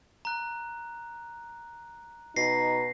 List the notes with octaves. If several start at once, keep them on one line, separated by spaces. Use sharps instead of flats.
A#5 F#6
B2 D#4 A#6 C7